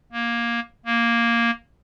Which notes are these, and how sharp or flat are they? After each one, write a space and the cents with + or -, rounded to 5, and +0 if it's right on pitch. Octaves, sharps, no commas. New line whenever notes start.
A#3 +10
A#3 +0